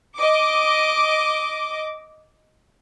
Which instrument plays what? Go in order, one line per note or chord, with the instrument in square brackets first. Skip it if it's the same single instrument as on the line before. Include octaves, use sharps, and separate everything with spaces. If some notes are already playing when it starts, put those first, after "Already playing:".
[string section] D#5 D6